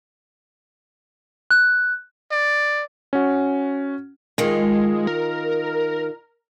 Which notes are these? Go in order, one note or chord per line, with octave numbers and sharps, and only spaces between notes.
F#6
D5
C#4 F#4
D#3 G#3 F4
A#4